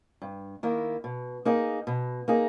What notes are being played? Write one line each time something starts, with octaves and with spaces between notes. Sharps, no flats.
G2
D#3 A#3 E4
B2
A#3 D#4 G#4
B2
A#3 D#4 G#4